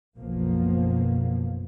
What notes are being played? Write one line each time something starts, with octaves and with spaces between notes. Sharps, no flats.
F#1 B1 F#2 B2 F3 A#3